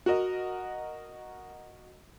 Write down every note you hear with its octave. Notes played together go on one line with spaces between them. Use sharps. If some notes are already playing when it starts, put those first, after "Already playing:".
F#4 A#4 D#5